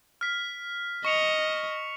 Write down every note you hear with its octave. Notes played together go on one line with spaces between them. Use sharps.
F6 B6
D#5 C#6 C#7 F7